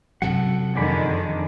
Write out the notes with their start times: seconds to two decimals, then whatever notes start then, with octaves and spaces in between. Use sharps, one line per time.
0.22 F#2 C3 F#3 A4 F#5
0.76 F2 D3 D#3 G#4 D5 B5